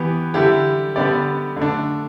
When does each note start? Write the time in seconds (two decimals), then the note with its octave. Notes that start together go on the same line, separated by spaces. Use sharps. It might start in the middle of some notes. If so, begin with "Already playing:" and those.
Already playing: E3 B3 G4
0.34 D3 G3 E4 G4
0.96 D3 G3 B3 G4 D5
1.57 D3 A3 D4